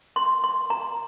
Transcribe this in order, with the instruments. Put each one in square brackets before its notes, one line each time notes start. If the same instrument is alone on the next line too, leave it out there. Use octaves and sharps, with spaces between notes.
[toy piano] C6
C6
A#5